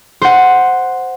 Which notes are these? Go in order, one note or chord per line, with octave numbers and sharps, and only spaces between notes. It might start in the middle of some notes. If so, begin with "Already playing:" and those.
C5 F#5